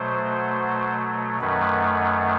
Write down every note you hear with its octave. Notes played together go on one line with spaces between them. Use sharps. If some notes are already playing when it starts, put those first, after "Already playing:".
Already playing: B2 F#3 A3 C5
F#2 D#3 F#3 A3 B4